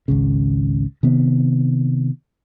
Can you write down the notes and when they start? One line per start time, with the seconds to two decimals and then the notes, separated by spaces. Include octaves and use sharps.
0.08 G#1 C#2 C#3
1.03 C3 D#3 B3